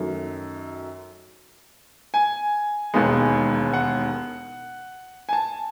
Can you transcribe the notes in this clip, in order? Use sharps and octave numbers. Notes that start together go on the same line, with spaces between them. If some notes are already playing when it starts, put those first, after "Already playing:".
Already playing: F#2 D#3 F#3 A3
G#5
E1 D#2 D#3 G#3 B3
F#5
G#5
A5